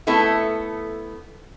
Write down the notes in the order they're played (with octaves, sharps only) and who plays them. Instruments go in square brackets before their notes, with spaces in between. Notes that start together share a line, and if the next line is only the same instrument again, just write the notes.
[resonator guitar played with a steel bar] A3 B3 E4 A4